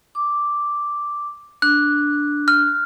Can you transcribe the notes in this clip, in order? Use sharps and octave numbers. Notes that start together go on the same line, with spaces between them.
D6
D4 F#6
F6